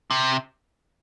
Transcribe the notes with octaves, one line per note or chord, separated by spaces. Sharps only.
C3